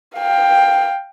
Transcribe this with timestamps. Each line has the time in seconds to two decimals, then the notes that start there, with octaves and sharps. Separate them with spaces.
0.16 F5 G5